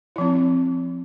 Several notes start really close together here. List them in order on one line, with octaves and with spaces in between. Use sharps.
E4 F3 C4